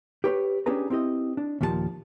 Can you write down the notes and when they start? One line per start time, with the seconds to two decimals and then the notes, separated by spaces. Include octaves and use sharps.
0.24 G4 B4 C#5
0.66 C#4 D4 G4 G#4 B4 A#5
0.90 C4 E4 G4 D#5
1.37 D4
1.61 D#2 A#2 F3 F4 A5